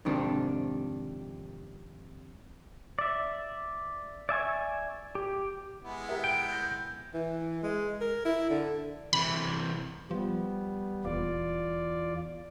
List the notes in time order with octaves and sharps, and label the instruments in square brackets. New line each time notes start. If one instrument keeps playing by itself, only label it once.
[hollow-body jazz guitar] F2 G#2 C3 D#3 D4
[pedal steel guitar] D5 E5
D5 E5 G#5 C#6
G4
[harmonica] G#3 B3 E4
[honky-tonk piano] G4 A#4 E5
[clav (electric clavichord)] G5 [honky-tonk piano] D7
[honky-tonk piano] G6 A#6
[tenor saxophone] E3
G#3
A#4
E4
D3
[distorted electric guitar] C3 E3 [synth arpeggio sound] B5
[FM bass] F3 [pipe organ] G3 B3
[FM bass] D#1 [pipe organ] E2 F4 D5